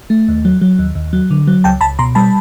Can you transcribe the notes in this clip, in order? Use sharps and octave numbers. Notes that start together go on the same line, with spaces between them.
A3
D#2
F#3
F#3
D#2
D#2
F#3
D3
F#3
C#2 G5 A5
C#2 A5 B5
B2 A#5 C6
G3 A5 B5